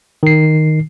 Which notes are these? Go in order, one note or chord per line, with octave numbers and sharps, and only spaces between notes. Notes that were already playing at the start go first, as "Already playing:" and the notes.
D#3 C7